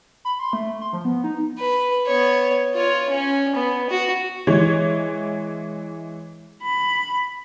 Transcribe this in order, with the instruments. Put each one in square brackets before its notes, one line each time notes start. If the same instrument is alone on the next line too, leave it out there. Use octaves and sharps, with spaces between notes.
[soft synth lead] B5
C6
A3
C6
F3
B3
D#4
[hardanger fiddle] B4
B3 C#5
F4 C#5
C#4
B3
F#4
[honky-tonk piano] E3 G#3 C#5
[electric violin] B5